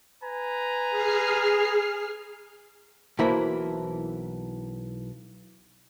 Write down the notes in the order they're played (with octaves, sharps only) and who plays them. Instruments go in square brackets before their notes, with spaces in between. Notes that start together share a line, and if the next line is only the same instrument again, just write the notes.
[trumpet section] B4 G#5 A#5
[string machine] G#4 F6 C7
[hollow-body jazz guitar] B1 E3 A#3 E4 C5 B5